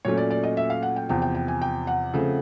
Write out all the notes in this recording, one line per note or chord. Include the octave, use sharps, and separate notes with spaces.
A#2 F#3 A3 C#4 C#5
D5
D5
D#5
E5
F5
F#5
G5
E2 C3 F3 G5
G5
G5
G#5
G5
F#5
C#3 F3 A3 C4